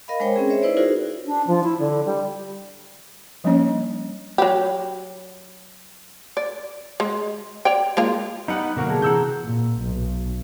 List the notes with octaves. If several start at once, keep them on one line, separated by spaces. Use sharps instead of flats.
A#4 D#5 F5 B5
G#3 D4 A#4 C5 C#5 G5
C4 C#4 G#4
C5 C#5 E5
D#4 E4 B4 C5 D5
D#4 F4 F#4 G#4 A#4 C5
D4
F3
E4
D3
G3
F3 G3 A#3 C#4 D4 C#5
F#3 G4
D5
G#3
C#5 D5 G5
G#3 A#3 F4
G3 B3 D#4 F#5
B2 D3 F#3 A#3 F#4 A#4
G#4 A5
C3 E3 G#4 F#5 A#5 E6 G6
A#2
B1